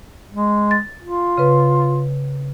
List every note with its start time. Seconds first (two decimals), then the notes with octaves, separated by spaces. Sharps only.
0.32 G#3
0.71 A6
1.03 F4
1.38 C#3 B4